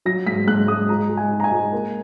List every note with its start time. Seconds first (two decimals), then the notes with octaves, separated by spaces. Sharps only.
0.05 F#3 A#6
0.27 G#2 B6
0.47 G#2 F#6
0.68 G#2 D#6
0.89 G#3 A#5
1.10 G#3
1.17 G#5
1.31 D#4
1.40 A#5
1.44 G#5
1.52 G#3
1.73 A#3